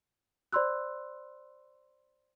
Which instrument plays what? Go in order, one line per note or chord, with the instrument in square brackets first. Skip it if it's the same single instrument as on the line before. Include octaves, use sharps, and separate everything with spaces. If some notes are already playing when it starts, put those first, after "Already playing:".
[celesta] C5 D5 B5 C6 E6 F#6